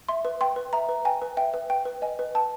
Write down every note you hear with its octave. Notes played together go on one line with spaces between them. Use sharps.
E5 C6
B4
G5 C6
B4
E5 A#5
B4
G5 G#5
B4
E5 G5
B4
G5
B4
D#5 G#5
B4
G5 A5